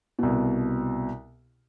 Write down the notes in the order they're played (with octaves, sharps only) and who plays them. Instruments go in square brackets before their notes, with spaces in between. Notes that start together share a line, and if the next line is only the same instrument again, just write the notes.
[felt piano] C2 B2